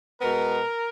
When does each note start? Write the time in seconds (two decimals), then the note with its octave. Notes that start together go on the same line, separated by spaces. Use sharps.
0.21 B2 G#3 B3 A#4